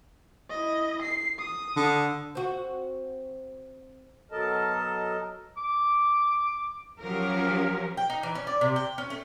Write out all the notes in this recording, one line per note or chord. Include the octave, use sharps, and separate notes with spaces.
E4 D#5
C7
D#6
D3
C4 F#4
B2 F#3 A4 A#4 D#5 A5
D6
F3 F#3 C#4 G4 A#4
G5
D#4
E3
C#4
D5
C3
G5
C#4
A3